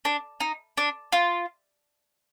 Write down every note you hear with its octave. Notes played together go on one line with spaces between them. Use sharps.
D4
D#4
D4
F4